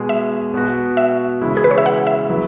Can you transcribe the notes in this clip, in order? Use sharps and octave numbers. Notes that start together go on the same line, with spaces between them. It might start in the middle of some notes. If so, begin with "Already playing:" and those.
Already playing: B2 G#3 B3 G#4
E5
B2 B3 F#4
E5
C#3 E3 G#3 E4
G#4
B4
C#5
E5
F#5
E5
F#3 B3 E4